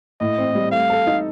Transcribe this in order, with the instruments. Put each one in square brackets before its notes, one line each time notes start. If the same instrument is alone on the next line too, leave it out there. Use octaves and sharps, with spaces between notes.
[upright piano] A2 [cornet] D#5
[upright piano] C4
G3
[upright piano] A3 [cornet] F5
[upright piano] A4
D#4